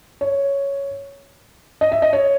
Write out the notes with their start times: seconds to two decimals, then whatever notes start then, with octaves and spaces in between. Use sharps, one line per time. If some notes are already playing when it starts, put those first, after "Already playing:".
0.21 C#5
1.81 D#5
1.92 E5
2.02 D#5
2.13 C#5